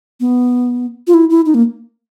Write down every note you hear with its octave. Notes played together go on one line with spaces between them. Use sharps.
B3
F4
E4
E4
D#4
A#3